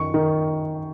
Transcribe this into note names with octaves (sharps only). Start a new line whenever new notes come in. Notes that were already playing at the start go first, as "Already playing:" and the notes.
Already playing: F#2 D#3 C#6
D#3